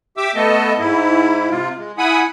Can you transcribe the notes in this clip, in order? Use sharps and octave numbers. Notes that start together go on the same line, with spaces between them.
G4 E5 D6 E6
A3 B3 A4 D#5
G#2 E4
C3 F4
G#3
E4 F#5 G#5 B5 D#6